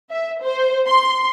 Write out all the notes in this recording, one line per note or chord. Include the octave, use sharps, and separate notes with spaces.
E5
C5
C6